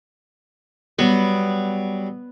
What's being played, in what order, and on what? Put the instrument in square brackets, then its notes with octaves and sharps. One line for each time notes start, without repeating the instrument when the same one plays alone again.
[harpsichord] F#3 G3 [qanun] B3